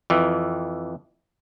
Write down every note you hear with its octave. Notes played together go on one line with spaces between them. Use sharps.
F2 E3